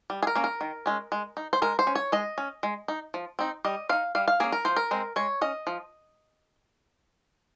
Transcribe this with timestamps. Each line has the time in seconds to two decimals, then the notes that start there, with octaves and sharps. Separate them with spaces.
0.10 G3
0.23 G#4
0.27 A#4
0.35 A#3 C#4
0.44 A#4
0.61 D#3
0.86 G#3 C#4
1.12 G#3
1.37 D#4
1.53 C5
1.62 G#3 A#4
1.79 C5
1.87 C#4
1.95 C#5
2.12 G#3 D#5
2.38 C#4
2.63 G#3
2.88 D#4
3.14 F3
3.39 C4 D#4
3.65 G3 D#5
3.89 C4 D#4 F5
4.15 G3 F5
4.28 F5
4.40 A#3 C#4 G#4
4.52 A#4
4.65 F3 C5
4.76 A#4
4.91 G#3 C4
5.16 G#3 C#5
5.41 C#4 D#5
5.67 F3